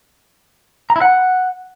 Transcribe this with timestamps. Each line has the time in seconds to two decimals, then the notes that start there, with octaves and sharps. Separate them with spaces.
0.90 A#5
0.96 E4
1.02 F#5